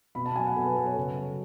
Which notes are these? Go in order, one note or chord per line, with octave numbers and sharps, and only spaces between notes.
B2 B5
A5
F#3 G#5
F#5
B2 A4
B4
F#3 A4
C#5
C#3
F#3